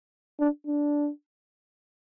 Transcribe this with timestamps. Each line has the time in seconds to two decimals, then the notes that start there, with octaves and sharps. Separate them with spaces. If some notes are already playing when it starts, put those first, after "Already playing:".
0.40 D4
0.67 D4